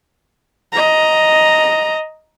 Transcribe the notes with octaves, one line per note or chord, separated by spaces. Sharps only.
D#5 A#5